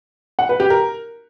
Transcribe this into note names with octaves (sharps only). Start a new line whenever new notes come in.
F#5
B4
G4
A#4